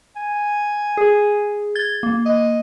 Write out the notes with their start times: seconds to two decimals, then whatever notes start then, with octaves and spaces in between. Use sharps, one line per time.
0.16 G#5
0.97 G#4
1.75 G#6 A6 G7
2.03 A#3
2.26 D#5